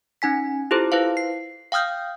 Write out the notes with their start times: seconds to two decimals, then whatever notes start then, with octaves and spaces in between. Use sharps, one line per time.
0.22 C#4 D#4 G#5 B6
0.71 E4 F4 G4 A4 C5
0.92 E4 B4 C5 F5
1.17 C7
1.72 F5 G5 D#6 F6 G6